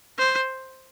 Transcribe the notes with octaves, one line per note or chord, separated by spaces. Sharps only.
C5